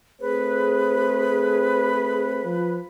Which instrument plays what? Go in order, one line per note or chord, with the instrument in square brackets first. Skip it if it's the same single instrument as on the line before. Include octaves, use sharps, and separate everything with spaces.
[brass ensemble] A3 C4 C5 [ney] G#4 [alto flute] B4
[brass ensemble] F3